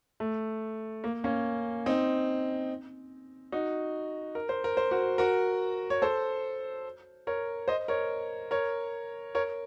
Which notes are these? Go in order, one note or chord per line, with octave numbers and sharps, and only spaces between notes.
A3
A#3
A#3 C#4
C4 D#4
D#4 F#4
A#4
C5
A#4
C5
F#4 A#4
F#4 A#4
C#5
A4 C5
A#4 C#5
C5 D#5
A#4 C#5
A#4 C#5
A#4 C#5